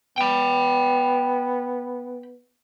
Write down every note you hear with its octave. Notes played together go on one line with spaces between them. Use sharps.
B3 G5 B5